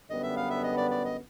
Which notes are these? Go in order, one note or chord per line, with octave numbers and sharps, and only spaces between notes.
F#2 D3 G3 B3 D#5
E5
F5
E5
D#5
D5
D5
D#5